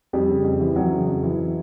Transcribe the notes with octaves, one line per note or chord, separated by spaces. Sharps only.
F2 G3
C#3
F2
E3
F2 F#3
C#3
F2
E3